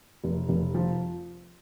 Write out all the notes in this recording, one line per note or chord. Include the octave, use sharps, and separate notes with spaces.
F1
F1
F3